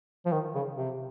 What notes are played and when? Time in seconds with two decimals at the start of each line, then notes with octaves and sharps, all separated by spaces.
0.25 F3
0.32 D#3
0.54 C#3
0.77 C3